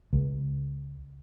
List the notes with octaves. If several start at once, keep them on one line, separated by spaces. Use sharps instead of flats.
C#2